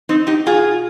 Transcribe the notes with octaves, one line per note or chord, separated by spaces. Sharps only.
C4 D#4
D#4 G4
B2 F4 G#4